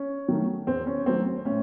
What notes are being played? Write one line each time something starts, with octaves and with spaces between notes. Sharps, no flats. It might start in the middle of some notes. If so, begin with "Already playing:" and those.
Already playing: C#4
D#3 F#3 A3
E2 C4
C#4
D#3 F#3 A3 C4
A2 C#4